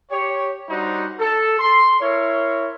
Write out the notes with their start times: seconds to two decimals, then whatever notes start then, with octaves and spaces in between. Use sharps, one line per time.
0.10 G4 C#5
0.69 G3 D4 D#4 F#4 C5
1.18 A4
1.58 C6
2.00 E4 A#4 C#5